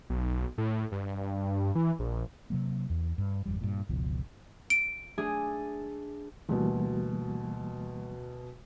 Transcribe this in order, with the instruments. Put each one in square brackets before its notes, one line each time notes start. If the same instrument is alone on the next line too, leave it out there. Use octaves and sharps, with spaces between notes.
[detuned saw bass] B1
A2
G2
E3
A#1
[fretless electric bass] C3 F#3 A#3
E2
G2
G#1 F2 G3
G2 A#2
F#1 C#2 B2 F3
[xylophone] D7
[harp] A3 D4 G#4
[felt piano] D2 B2 [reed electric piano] E3 G3 A#3